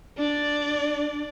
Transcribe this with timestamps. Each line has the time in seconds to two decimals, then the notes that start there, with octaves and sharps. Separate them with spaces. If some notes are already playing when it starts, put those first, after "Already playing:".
0.17 D4 D5